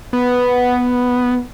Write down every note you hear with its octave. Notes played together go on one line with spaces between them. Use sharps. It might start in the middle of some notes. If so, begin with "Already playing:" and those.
B3